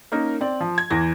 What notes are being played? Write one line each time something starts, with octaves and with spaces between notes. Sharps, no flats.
A#3 C#4 D#4 A#4
C4 D5
F3
G#6
E2 E3 A#6